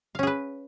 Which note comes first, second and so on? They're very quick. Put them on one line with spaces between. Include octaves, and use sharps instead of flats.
F5 C#4 G#4 B4